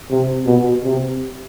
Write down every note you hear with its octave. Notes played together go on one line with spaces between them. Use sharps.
C3
B2
C3